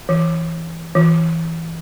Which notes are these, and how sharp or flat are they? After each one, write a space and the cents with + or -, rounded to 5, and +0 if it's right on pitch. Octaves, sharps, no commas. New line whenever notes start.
E3 +0
E3 -5